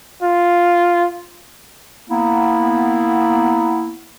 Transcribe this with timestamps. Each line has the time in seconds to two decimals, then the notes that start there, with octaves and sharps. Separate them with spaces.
0.23 F4
2.09 A#3 B3 E4